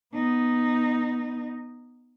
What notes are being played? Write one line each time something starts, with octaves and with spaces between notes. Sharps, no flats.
B3 D#4